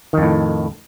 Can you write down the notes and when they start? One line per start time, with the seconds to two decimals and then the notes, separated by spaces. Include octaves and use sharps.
0.13 D#3
0.18 F2
0.22 A2